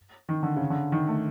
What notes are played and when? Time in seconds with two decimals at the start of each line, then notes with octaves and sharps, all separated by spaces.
0.29 D#3
0.43 D3
0.56 C#3
0.70 D3
0.92 D#3
1.08 A3